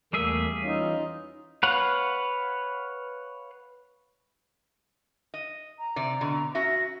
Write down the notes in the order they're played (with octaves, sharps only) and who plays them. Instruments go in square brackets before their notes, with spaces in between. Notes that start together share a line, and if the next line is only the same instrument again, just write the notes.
[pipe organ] E2 A3 A#3 [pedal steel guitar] G3 G#4 E5
[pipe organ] E3 C#4 F4 [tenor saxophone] D#4
[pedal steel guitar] B4 C#5 F5 F#5
[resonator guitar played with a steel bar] D#5
[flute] A#5
[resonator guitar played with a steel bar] C3 D5
B2 D3
[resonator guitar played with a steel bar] C#4 F#4 E5 [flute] A#6